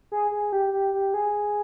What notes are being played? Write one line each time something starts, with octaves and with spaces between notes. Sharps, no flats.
G#4
G#4
G4
G4
G4
G#4